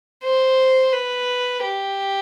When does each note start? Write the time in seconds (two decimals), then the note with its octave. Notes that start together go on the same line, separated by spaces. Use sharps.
0.23 C5
0.93 B4
1.62 G4